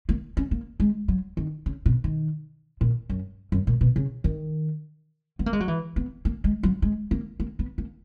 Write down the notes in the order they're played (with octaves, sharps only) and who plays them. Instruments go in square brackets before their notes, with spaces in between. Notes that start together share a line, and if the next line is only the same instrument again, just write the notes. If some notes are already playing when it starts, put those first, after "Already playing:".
[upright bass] A#3
C#4
A#3
G#3
F#3
D#3
C#3
B2
D#3
A#2
F#2
F#2
A#2
B2
C#3
D#3
B3
A#3
G#3
F#3
E3
B3
A#3
G#3
F#3
G#3
A#3
A#3
B3
A#3